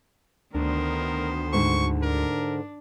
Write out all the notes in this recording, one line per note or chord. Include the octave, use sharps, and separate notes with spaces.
D2 D#3 B3 D4 A#4 C5
G#2 D3 A3 C#6
D4 A#4